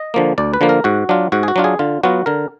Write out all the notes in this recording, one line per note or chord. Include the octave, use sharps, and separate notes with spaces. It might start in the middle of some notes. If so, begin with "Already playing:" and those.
Already playing: D#5
D3 F3 A#3
D2 D5
B4
D3 F3 A#3
A#4
G#2 F#4
F#3 D4 F4
G#2 F#4
G#4
F#4
F#3 D4 F4
G#4
D3 F4
F#3 B3 F4 F#4
D3 A#4